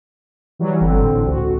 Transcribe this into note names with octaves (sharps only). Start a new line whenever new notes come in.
E3 F#3 G3
G1 D3 C4
A2
C#2 F#4